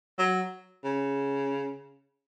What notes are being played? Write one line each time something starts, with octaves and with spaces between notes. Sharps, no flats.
F#3
C#3